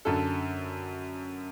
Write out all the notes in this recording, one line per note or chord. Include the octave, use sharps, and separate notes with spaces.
F#2 D3 A4